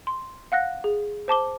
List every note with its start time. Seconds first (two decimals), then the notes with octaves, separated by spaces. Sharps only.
0.07 C6
0.52 F5 F#5 F#6 A#6
0.84 G#4
1.28 C5 A5 D6 G7